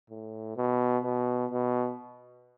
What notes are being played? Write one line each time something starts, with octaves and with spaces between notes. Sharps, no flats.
A2
B2
B2
B2